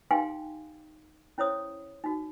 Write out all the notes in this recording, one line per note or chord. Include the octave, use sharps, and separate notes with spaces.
D#4 G4 F5 G5 G#5 C6
C#4 E4 C5 C#5 D#6
D#4 F#4